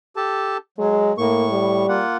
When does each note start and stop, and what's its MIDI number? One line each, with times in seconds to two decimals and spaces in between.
0.16 0.57 67
0.16 0.57 69
0.16 0.57 81
0.78 1.13 54
0.78 1.11 56
1.18 1.87 45
1.18 1.45 58
1.18 1.87 85
1.51 2.02 55
1.89 2.17 58
1.89 2.17 65
1.89 2.17 78